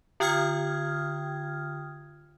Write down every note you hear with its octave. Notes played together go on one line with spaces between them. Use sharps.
D3 F4 G5 D#6 F6 G#6